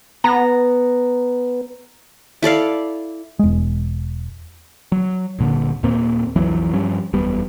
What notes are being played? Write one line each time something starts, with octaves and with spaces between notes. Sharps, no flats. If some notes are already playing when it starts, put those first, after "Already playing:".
B3 A#5
E4 A4 D5 F5
E1 G#3
F#3
D#1 A#2 D3
D#2 A#2 A#3 C4
B1 F2 E3 F#3
G2 F3 G3 C#4
F#1 E2 G3 B3